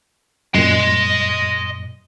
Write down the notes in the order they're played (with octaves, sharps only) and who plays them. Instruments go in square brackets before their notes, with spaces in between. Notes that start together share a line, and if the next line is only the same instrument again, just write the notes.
[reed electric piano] F#2 A#2 [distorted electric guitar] D#5 C6